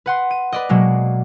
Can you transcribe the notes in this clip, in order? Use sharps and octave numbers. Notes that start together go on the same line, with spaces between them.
B4 F#5 C6
D#7
B4 D5 D#5
B2 F#3 G#3 A#3